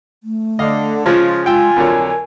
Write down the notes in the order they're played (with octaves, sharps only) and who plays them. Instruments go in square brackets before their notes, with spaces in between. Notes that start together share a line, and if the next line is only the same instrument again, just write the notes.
[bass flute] A3
[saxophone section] D3 [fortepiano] D#5 F5
[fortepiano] C#3 F3 G#3 [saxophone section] F4
[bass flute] G#3 [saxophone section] F4 [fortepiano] G5 E6 [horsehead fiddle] G#5
[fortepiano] F2 D3 F#3 [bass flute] A#4